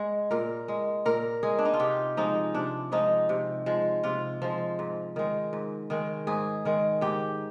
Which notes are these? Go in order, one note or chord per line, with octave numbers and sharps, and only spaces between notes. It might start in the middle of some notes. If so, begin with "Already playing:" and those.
Already playing: G#3
A#2 A#4
G#3
A#2 A#4
G#3 G#4
D4
D#4
F4
C3 G4
F3 G#3 D#4
C3 D4
F3 G#3 D#4
C3
F3 G#3
C3 F4
F3 G#3
G#2
D#3 G#3
G#2
D#3 G#3
G#2 G#4
D#3 G#3
G#2 G4